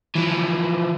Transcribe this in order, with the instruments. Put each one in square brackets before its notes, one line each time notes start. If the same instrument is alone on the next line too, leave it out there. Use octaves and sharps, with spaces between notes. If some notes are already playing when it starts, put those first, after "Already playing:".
[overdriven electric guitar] E3 F3